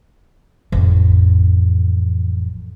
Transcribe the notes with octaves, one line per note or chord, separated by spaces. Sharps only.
A1 F2